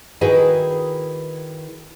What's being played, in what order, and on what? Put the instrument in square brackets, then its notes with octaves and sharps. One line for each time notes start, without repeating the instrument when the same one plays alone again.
[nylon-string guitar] D#3 E4 F#4 G#4 B4 D#5